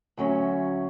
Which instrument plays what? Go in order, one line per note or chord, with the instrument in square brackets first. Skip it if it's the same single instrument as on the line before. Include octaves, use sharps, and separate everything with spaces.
[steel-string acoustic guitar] D2 F#3 C#4 E5